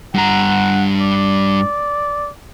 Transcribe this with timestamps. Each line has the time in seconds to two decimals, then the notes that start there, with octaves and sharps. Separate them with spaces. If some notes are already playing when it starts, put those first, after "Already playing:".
0.14 G2 F#5 A#5
1.01 D5